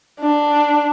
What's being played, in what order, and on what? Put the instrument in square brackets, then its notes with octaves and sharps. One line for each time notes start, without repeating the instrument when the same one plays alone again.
[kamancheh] D4